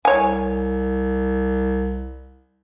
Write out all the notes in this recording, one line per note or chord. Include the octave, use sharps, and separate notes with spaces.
C2 C#5 G#5